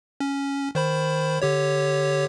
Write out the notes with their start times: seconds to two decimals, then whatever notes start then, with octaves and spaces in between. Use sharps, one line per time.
0.20 C#4
0.75 D#3 C5 B5
1.42 D3 G4 C#5